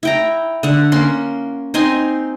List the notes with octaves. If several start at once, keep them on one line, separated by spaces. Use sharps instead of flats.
E4 G5 A#5
D3 F#5
A#3 C#4 C6
C4 D#4 G#5 C6